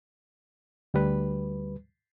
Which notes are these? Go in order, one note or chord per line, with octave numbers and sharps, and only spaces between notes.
D2 G3 B4